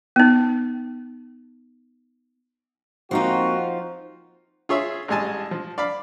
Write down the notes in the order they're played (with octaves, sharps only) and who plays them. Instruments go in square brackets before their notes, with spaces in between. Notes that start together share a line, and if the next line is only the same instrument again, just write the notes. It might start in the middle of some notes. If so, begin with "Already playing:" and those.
[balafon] B3 D#4
[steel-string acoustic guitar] F3 D#4 F4 [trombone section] A#3 C4 F#4
[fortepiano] F4 G#4 C#5 E5
A1 G3 G#3 G#5 A5
F3
D5 F5 B5